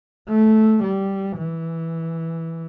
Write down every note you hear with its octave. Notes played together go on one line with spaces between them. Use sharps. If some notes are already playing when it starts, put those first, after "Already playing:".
A3
G3
E3